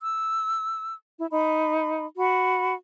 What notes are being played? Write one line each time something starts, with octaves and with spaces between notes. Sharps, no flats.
E6
E4
D#4 B5
F#4 B5